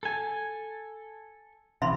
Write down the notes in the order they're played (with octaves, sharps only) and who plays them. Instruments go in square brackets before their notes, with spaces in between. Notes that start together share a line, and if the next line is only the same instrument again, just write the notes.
[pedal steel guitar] A4 G#5
[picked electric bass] C3 E3 [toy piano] E5 B5 C6